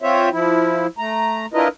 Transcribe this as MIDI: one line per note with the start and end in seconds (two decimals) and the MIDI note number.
0.02 0.29 60
0.02 0.29 65
0.02 0.29 72
0.02 0.29 73
0.02 0.29 76
0.32 0.87 53
0.32 0.87 64
0.98 1.46 57
0.98 1.46 82
1.54 1.68 62
1.54 1.68 64
1.54 1.68 65
1.54 1.68 70
1.54 1.68 71
1.54 1.68 75